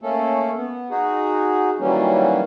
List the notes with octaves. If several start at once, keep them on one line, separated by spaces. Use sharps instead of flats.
A3 A#3 C#4 A4
B3
D#4 F#4 G#4
D#3 E3 F#3 G3 A#3 C#4